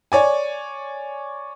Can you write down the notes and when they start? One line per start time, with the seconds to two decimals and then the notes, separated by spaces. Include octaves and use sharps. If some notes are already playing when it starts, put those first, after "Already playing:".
0.12 C#5 D5 G#5